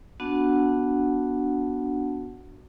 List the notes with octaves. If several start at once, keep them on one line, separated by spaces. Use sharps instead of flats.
B3 D4 F#4 F#5 A5